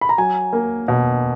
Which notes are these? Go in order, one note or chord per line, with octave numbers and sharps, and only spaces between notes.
B5
A#5
F#3 G#5
A#3
B2